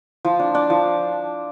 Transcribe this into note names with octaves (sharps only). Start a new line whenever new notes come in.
F3
D4
D4
F3